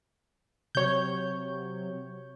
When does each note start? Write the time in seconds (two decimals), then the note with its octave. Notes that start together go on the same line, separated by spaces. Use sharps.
0.75 C3 F#3 C#5 G6